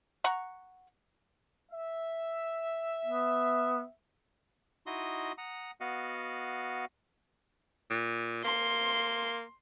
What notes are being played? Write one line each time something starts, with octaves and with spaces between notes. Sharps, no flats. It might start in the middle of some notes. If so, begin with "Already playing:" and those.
F#5 A#5 C#6
E5
B3
D#4 E4 F#4 D#5 C6 D#6
F#5 A#5 D#6
B3 F#4 D#5 F5 F#5
A#2
A#3 C6